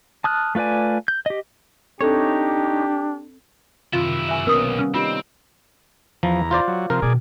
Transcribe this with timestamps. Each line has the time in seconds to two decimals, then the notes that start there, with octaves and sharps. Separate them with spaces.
0.24 A5 D#6 F6 F#6
0.55 A3 F4 B4 D5 G#5
1.08 G6
1.26 G4 D#5
2.01 C4 D4 D#4 G4 A4 C#5
3.93 F#2 C3 D#3 E4 F4 F5
4.29 E5 G#5 C#6
4.47 B1 A#3 B3 C#4 A#4 D#6
4.79 G3 C#4
4.94 C4 D#4 F4 G4
6.23 E2 F3 A#5
6.51 F4 C5 D5
6.68 F#3
6.90 C3 F3 A#4
7.02 B2 D#3 G#4 D5